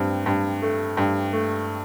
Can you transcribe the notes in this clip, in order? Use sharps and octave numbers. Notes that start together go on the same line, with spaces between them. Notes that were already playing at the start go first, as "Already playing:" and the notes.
Already playing: G2 C4
G2
A3
G2
A3